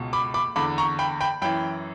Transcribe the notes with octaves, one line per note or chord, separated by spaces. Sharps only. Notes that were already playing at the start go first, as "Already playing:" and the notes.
Already playing: C#2 B2
B5 D6
B5 D6
E2 D3 B5 D6
A#5 C#6
G5 B5
G5 B5
F#2 E3 G5 B5